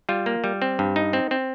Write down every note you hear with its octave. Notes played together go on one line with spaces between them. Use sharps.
G3 F4
A#3
G3
C4
G2
D#4
C4
C4